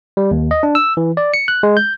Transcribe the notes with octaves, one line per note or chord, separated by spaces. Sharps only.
G3
D#2
D#5
D4
E6
E3
D5
C#7
F#6
G#3
G6